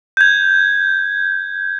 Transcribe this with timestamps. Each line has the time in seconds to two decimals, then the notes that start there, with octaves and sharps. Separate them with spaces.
0.17 G6 G#6